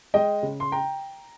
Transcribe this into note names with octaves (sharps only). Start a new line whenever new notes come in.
G#3 D#5 G5
C#3
C6
G5 A#5